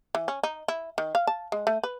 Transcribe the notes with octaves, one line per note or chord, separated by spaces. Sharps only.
E3
C#4
D#4
E4
D#3
F5
A5
G#3
A3
B4